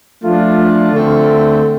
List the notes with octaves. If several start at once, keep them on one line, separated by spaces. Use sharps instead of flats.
F3 A3 D4 F4
D3 A3 C4